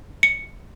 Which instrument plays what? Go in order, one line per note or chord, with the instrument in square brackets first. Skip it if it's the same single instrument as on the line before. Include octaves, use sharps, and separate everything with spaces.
[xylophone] C#7